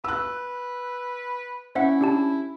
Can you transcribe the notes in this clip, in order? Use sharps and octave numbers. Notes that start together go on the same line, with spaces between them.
B4 E6 F#6
C#4 E4 C5 E5 F#5
D4 G4 A5